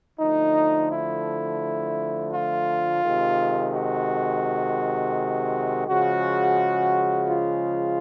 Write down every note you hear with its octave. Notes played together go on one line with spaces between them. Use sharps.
D3 F3 A3 D#4
E4
F4
C3 D#3 G#3
F#4
C#3 F3 G#3 F#4
F4